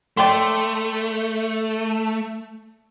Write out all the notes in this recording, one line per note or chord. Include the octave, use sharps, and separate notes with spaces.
A3 D5 G5 C6